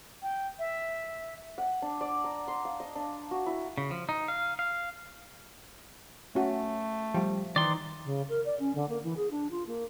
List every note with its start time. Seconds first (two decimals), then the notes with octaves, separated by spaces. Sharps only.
0.22 G5
0.59 E5
1.58 F#5
1.82 D4
2.01 D5
2.24 A#5
2.48 C6
2.65 F5
2.80 D#5
2.95 D4
3.31 F#4
3.46 E4
3.78 C#3
3.91 F3
4.09 D#4
4.28 F5
4.59 F5
6.35 A3 C#4 F#4
7.15 F3 G3
7.56 D#3 E3 D#4 D5 C6
8.05 C#3
8.29 A#4
8.45 D5
8.59 C#4
8.75 D3
8.89 A#3
9.03 E3
9.17 G#4
9.31 D4
9.51 F4
9.67 A#3